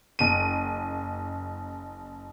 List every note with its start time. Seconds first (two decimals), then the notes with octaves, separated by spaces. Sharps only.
0.19 F#1 D#7